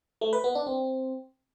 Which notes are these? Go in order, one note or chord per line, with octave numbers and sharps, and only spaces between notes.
A3
B4
B3
D4
C4